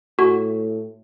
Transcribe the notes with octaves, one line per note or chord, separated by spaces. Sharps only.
A2 F#4